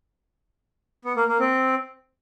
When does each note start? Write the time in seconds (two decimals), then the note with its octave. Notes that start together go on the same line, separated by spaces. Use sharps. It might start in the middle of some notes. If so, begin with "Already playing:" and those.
1.05 B3
1.16 A#3
1.28 A#3
1.39 C4